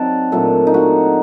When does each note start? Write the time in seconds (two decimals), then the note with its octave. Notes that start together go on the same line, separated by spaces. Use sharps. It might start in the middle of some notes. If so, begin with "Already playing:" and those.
Already playing: F#3 C4 D#4 D5 F#5 A5
0.32 A#2 F#3 A3 D4 A4
0.67 D#4
0.74 F#4